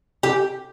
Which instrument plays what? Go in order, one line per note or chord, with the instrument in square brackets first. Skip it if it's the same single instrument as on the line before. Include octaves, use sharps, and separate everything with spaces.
[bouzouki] G4